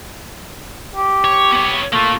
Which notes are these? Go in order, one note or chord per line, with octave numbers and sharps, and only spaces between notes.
G4
C#5
B3 C#5
A3 A#3 F4